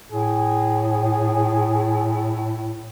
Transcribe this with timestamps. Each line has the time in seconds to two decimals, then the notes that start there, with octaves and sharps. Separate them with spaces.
0.12 A2 G#4